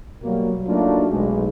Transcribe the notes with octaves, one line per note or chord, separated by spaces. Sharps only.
B2 F#3 G3 A#3
F#3 A3 A#3 D4 D#4 F4
B1 G#3